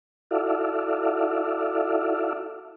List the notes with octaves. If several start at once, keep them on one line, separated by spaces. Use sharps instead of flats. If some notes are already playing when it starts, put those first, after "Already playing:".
E4 F#4 A4 D5 E5 F5